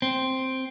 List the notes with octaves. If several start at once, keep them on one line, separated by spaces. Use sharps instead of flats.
C4